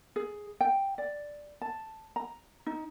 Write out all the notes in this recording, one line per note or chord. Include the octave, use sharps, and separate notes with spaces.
G#4
G5
D5
A5
A#5
D#4